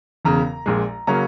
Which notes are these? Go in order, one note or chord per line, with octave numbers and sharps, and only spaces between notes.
E1 E2 C#3 A#5
A#1 A#2 G#3
C#3 F#3 A#3 C#4 A#5